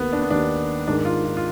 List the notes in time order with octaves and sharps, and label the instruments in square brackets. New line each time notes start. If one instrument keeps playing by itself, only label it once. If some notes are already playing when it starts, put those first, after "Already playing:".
Already playing: [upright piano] D#2 D#3 A#3 [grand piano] B3
[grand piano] D4
B3
[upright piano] D#2 D#3 A#3 [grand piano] D4
[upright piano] G#2 D#3 A#3 [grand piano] D4
[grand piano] F4
F4
F4